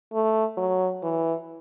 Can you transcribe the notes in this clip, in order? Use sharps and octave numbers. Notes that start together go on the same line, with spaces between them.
A3
F#3
E3